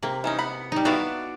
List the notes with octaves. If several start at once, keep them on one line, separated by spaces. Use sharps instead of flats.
C3 A#3
E3 C#4 D#4
B3 B5
G3 D#4
B3 D4 E4 F#4 F5